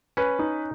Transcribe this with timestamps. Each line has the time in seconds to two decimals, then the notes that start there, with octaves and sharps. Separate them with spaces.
0.17 C#4 B4
0.39 D#4